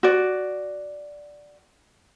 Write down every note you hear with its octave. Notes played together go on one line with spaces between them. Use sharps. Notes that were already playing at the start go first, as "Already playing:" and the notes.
F#4 D5